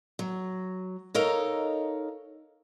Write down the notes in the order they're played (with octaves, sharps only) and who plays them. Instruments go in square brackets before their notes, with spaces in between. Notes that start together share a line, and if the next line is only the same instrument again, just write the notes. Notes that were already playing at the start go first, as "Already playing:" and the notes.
[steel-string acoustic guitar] F#3
D#4 A4 A#4 C#5 D#5 F5